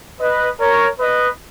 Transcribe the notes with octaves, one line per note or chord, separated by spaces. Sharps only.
B4 D#5
A#4 C#5
B4 D#5